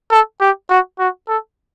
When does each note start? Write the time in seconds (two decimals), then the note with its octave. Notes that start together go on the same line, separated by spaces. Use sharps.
0.11 A4
0.41 G4
0.70 F#4
0.99 F#4
1.28 A4